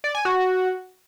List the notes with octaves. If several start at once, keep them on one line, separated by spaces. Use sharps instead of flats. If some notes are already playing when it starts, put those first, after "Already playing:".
D5
G#5
F#4